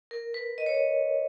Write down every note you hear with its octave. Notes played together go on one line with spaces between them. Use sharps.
A#4
B4
D#5
C#5
D#5